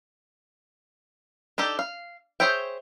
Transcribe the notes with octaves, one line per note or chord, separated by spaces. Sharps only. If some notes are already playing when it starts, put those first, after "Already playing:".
D4 D#4 G4 A4
F5
G#4 C5 C#5 E5 G5